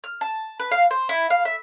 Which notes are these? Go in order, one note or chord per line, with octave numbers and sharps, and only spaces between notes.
F6
A5
B4
F5
C5
E4
F5
E5